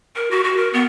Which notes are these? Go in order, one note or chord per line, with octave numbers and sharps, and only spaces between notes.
A#4
F#4
F#4
A#4
B3